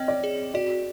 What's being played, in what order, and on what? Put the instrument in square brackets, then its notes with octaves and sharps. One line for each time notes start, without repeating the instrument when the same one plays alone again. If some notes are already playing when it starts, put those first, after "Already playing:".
Already playing: [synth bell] C4 C#5 [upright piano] D#5 G5
[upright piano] D5
[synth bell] G#4
[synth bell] F#4 [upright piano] D5